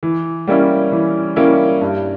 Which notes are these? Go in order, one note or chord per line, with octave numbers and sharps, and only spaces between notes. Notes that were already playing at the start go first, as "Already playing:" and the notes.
E3
G3 A#3 C#4 E4
E3
G3 A#3 C#4 E4
G2